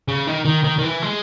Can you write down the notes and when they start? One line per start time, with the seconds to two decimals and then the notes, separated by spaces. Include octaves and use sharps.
0.08 C#3
0.27 D#3
0.45 D#3
0.64 D#3
0.78 D#3
0.84 E3
1.02 G#3